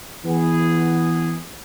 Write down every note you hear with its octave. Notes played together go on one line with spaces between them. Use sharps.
E3 B3 G#4